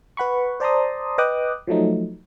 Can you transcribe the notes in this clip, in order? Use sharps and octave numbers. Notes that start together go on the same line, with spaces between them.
B4 F#5 B5 C#6
C5 D5 A5 A#5 C6 D#6
B4 D#5 G5 D6 D#6 F#6
F3 F#3 A3 D#4